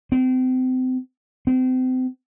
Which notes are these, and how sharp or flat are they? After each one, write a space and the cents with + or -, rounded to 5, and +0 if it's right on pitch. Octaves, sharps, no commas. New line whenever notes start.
C4 -35
C4 -35